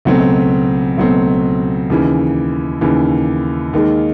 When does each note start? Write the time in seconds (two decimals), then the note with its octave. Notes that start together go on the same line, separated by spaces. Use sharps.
0.05 C#2 B2 F#3 A3 C4
0.97 C#2 B2 F#3 A3 C4
1.90 D#2 C#3 E3
2.81 D#2 C#3 E3
3.73 D#2 D#3 G#3